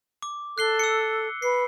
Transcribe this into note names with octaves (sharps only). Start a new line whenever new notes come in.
D6
A4 F#6 C7 G7
E6 C#7
B4 C7